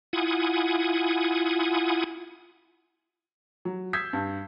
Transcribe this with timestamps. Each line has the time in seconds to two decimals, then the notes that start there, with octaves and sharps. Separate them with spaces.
0.13 E4 F4 F#5 G#5 D#6
3.65 F#3
3.93 D#6 E6 G6 G#6 B6 C7
4.13 G2